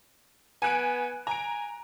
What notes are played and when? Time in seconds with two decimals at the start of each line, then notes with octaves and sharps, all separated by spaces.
0.62 B3 G#5 F#6 D7
1.27 G#5 A#5 D7